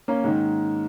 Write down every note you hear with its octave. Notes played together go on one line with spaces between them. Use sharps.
A#3 C#4
G#2 D#3